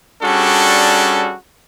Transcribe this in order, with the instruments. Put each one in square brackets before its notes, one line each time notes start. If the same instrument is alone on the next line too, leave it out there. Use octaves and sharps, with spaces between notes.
[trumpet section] G3 C#4 D4 F#4 G#4 A4